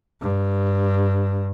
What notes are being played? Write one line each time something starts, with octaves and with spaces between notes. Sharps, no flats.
G2